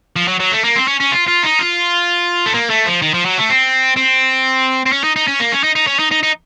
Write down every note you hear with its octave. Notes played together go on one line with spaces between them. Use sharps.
F3
F#3
F#3
A3
A#3
C4
C#4
C#4
F4
F4
D#4
F4
A3
A#3
A3
F3
D#3
F3
F#3
A3
C4
C4
C4
C#4
D#4
D#4
C#4
A#3
C#4
D#4
D#4
C#4
D#4
D#4
D#4